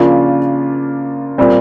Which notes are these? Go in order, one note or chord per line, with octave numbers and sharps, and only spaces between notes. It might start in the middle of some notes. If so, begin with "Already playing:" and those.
Already playing: C#3 F3 A#3 D4 F4
A#2 G3 C4